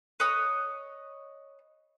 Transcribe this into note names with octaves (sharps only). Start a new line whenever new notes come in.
B4 C#5 D#5 D#6